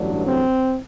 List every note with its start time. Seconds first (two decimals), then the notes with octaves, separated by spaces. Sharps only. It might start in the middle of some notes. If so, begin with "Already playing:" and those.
Already playing: A1 G2 D3 F#3 D4
0.25 C4